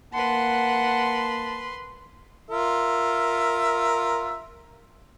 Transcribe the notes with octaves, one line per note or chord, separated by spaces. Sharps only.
A#3 B4 F#5 A5 C6
F4 A#4 E5